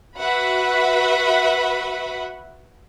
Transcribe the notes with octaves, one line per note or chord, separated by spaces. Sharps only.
F#4 B4 E5 F#5 B5